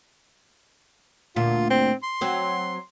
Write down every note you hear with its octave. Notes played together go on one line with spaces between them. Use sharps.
D2 A#2 F4
C4
C6
F#3 C4